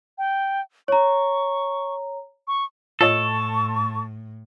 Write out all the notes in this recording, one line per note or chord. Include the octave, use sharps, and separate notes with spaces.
G5
C#5 A#5 C#6
C#6
A2 F4 A4 C#5 D#5 C#6